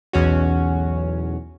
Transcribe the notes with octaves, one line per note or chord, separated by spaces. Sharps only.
B1 E2 C#4 F#4